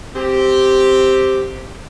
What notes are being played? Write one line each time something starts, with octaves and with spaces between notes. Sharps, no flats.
C4 G4